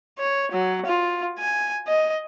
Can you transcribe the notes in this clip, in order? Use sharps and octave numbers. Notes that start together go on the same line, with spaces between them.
C#5
F#3
F4
G#5
D#5